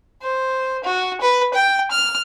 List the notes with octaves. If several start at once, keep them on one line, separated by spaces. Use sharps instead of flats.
C5
F#4
B4
G5
F6